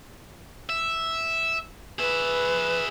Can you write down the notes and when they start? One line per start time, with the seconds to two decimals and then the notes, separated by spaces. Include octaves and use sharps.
0.70 E5
1.99 G#4 B4 E5